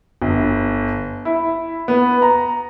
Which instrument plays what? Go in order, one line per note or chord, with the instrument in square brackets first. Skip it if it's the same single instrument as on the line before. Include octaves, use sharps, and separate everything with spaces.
[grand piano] G1
E4
B3
A#5